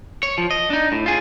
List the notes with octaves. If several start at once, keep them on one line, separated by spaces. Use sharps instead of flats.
C#5
F3
D#5
D4 D#4
A2
F4 G#4